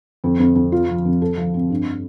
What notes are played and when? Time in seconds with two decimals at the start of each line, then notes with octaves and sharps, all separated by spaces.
0.24 F2
0.40 F2
0.55 F2
0.72 F4
0.89 F3
1.05 F2
1.22 A4
1.37 F3
1.54 C4
1.70 G2